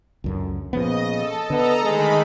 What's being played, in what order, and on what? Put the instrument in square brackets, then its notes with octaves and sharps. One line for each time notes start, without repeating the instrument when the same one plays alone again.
[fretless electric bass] C#2 F#2 D3
[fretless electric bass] A#2 F3 B3 [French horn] C#3 [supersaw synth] D#5
[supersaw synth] A4
[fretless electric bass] D3 [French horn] B3 [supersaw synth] A4 D#5 A#5
[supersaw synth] D#3 A3 B5 [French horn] G#3